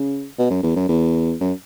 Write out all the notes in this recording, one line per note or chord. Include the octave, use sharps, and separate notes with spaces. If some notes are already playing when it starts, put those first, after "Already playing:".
Already playing: C#3
B2
F#2
E2
F#2
E2
F#2